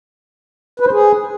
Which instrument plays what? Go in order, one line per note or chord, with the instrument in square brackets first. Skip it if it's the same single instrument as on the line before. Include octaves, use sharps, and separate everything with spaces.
[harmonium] B4
C5
G#4